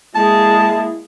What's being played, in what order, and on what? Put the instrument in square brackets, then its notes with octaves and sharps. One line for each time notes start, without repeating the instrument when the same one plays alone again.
[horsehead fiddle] G#3 G#4 [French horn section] A#3 E4 [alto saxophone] A5